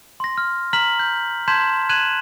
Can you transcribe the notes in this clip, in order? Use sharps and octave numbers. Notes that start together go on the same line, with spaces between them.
C6 A#6
F6
A#5 F6 B6 F#7
G6
A5 C6 G6 G#6 B6 E7
F#6 G#6 D#7 E7 F#7